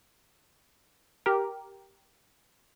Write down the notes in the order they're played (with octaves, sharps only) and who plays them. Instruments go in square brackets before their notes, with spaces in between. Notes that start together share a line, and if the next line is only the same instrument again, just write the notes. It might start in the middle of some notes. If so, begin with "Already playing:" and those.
[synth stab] G4 A#4